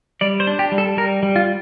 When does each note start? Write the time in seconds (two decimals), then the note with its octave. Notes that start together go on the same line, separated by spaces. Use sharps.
0.21 G3 D5
0.40 C5
0.47 D4
0.59 G4
0.72 G3
0.78 A4
0.97 G3 A#4
1.23 G3
1.36 F4